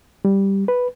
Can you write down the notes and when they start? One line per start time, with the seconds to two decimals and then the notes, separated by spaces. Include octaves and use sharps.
0.25 G3
0.68 B4